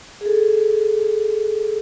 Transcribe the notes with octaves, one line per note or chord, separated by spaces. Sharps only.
G#4
A4